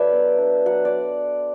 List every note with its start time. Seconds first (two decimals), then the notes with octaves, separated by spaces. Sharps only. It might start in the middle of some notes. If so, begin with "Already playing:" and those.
Already playing: F#3 D4 A4 B4 D5 E5
0.11 B3
0.38 D4
0.66 F#3 F#5
0.85 D5